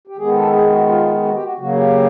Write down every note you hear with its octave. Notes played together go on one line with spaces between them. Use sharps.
G4
D#3 G#3 B3 G#4
A4
G#4
F#4
F4
F#4
G4
F#4
C#3 F#3 A#3 F#4
G4